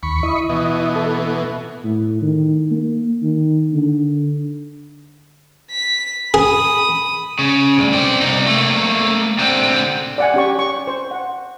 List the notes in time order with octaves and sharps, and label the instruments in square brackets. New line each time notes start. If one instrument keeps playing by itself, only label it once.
[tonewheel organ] D#2 [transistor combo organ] B5 C#6
[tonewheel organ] E4 D#5
[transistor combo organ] B2 E3
[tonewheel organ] A4
B3
[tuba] A2
D#3
A#3
D#3
D3
[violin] B6
[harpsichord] G#4 [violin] B5 D#6
[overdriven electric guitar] C#3
D2 G2
C4 D5
C2 D#4
A3 A#3
D3 C4
[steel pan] D5 F#5 G#5
C#4 G4 C#6
C#6
C5
F#5